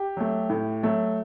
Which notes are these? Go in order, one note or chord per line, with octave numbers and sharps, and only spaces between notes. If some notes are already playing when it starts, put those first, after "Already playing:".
Already playing: G4
F#3 A3
A2
F#3 A3